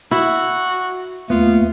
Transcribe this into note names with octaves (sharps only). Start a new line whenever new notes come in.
E4 F#4
D#2 A3 B3 F4